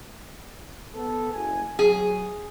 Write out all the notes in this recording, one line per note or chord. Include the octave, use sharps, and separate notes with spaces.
B3 A4
F#1 G#5
F#3 G#4